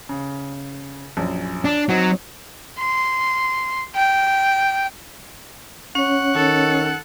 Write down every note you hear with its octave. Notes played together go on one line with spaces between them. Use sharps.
C#3
A#1 F#2
D4
F#3 C4 D#4
C6
G5
C#4 C#5 F#5
D#3 A4